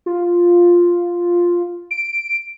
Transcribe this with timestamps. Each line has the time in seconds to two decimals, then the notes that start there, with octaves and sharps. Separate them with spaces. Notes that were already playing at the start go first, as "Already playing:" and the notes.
0.06 F4
1.91 D7